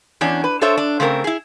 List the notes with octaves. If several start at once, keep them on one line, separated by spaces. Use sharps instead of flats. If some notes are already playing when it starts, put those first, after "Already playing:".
E2 C#4 D4
B4
D4 A4 C5 C#5 E5
D4
C#3 A3 C4 A#4
E4 G#4